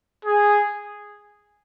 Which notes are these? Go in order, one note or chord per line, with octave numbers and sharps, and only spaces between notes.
G#4